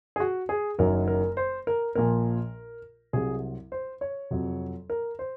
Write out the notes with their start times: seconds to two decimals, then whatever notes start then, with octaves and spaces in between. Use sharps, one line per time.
0.16 G#4
0.20 F#4
0.49 G#4
0.78 F#1 F#2 D#3 F#3 A#4
1.08 A#4
1.37 C5
1.67 A#4
1.95 A#1 A#2 F3 A#4
3.13 C2 C3 F#3 G#4
3.72 C5
4.01 C#5
4.31 F2 C3 F#3
4.90 A#4
5.19 C5